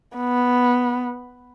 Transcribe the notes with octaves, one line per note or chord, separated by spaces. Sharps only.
B3